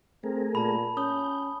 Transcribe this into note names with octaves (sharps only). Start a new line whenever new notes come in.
A3 C4 G#4 A#4
A#2 A5 B5
C#4 D#6 G6